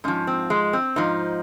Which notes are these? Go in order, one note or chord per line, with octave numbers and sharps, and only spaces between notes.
G#2 F3 C#4
C4
G#3
C4
G#2 F3 D#4